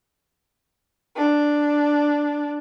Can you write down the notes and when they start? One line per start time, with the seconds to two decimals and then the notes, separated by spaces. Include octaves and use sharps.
1.16 D4